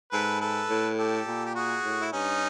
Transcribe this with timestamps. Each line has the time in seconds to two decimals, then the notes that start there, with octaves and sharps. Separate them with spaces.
0.12 G#2 A4 B4
0.41 A4 B4
0.69 A2
0.98 G4 A4
1.27 A#2
1.45 G4
1.55 F#4 G#4
1.84 A2
2.01 E4
2.13 G2 C#4 D#4